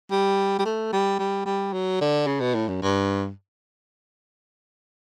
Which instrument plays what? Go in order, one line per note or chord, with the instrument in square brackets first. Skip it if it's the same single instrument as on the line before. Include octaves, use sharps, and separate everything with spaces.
[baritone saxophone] G3
G3
A3
G3
G3
G3
F#3
D3
C#3
B2
A2
F#2
G2